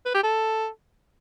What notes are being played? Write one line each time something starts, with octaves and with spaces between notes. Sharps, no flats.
B4
G4
A4